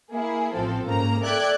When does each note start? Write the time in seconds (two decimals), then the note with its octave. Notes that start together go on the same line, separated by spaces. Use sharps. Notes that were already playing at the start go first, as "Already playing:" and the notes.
0.13 A#3 E4 G#4
0.53 A1 F3 C4 A4
0.84 G#2 C#3 A#3 A#5
1.24 A4 D5 E5 G5 F#6 G#6